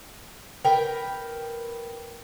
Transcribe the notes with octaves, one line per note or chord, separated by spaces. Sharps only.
A#4 B4 G5